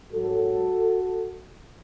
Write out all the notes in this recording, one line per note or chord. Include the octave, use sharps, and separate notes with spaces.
G#2 F#3 F#4 A4